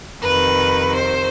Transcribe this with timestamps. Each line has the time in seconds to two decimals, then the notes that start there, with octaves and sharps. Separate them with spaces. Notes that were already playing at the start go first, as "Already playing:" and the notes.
0.22 F2 C3 D#3 B4
0.94 C5